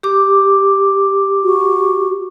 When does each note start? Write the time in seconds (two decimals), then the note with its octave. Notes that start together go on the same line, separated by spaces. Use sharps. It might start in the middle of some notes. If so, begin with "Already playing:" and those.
0.03 G4 D6
1.44 F#4